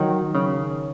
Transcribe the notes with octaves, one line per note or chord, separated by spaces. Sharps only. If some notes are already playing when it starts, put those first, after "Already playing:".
Already playing: D#3 F#3
C#3